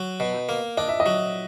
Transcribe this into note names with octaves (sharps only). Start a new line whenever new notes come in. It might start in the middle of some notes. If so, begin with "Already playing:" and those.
Already playing: F#3
B2
A#3
D4 D#5
E5
D#5
F#3